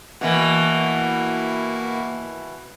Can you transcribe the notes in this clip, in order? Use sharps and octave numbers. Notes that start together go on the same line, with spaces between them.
B2 E3 A#3 E4 F#4